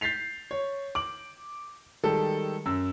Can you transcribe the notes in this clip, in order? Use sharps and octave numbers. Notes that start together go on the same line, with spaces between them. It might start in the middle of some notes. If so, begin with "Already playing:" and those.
G6 A6 B6 C7 F7
C#5
D6 F#7
D#3 G3 G#3 A4
F#2 E6